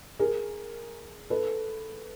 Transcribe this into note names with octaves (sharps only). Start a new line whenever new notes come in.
G#4 A#4
A4 B4